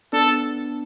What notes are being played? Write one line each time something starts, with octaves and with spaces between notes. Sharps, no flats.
B3 D4 A4